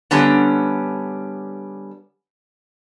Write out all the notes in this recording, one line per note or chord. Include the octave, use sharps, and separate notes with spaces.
D3 G3 B3 C#4